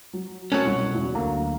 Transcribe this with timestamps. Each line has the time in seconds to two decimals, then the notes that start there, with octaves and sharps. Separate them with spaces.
0.13 F#3
0.52 F#3 A3 C#4 A#4 A5 F#6
0.65 C2 B2 C#6
0.94 F#1 E2 E4
1.15 D2 D3 A#3 A#5